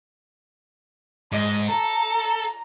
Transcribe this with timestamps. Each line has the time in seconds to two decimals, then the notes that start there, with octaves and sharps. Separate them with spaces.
1.32 G#2 D#5
1.69 A4 A#5